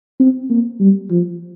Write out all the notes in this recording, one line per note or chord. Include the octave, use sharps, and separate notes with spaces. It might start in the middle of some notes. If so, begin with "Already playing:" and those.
C4
A#3
G3
F3